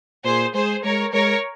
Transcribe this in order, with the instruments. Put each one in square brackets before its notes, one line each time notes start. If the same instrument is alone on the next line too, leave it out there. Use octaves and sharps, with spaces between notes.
[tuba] A#2 [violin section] G#4 C5
[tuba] G#3 [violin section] G#4 C5
[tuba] G#3 [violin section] A#4 C#5
[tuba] G#3 [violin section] A#4 C#5